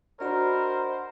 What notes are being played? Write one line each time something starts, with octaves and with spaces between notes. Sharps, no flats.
D4 F#4 A#4 C5 D#5 A#5 B5